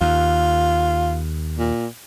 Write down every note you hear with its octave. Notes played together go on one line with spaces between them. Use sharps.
D#2 F4
A#2